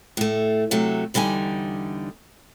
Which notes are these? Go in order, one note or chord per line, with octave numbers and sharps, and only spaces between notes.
A2 A3
C3 F#3 A3
E2 D3 G3 D#4 G#5